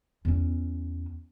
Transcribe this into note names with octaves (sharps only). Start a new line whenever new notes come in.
E2 C#4